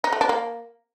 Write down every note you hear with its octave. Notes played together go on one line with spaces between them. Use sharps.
D#4
A3
D4
A#3